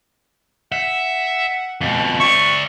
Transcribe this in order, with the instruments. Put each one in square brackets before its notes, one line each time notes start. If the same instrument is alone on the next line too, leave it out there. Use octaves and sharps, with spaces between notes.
[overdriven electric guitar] E5 [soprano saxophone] F#5
[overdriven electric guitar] F2 B2
[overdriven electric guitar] D5 E5 [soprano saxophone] C#6